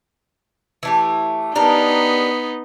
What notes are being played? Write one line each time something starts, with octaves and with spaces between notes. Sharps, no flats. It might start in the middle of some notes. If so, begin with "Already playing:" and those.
E3 A3 G4
B3 D4 D#4 G4 A#4